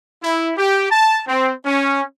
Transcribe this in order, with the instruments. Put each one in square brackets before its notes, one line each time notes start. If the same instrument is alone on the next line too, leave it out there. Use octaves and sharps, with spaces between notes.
[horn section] E4
G4
A5
C4
C#4